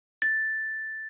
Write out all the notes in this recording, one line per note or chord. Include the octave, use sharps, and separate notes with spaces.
A6